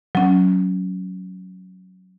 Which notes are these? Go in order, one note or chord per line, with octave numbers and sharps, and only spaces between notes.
F#3 C#4